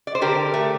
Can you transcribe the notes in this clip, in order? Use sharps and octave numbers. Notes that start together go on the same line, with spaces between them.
D5
C5
D3 G4 A#4
A3